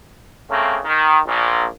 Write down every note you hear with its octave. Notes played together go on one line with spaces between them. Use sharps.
C#3 A3 A#3 C4
D#3
A#1 A#2